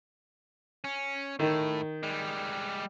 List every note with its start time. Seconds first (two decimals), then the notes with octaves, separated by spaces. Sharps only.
0.84 C#4
1.40 A2 D#3
2.03 G3 G#3